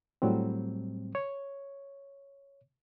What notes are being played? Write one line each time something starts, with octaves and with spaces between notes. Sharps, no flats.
A2 F#3 G3 C4
C#5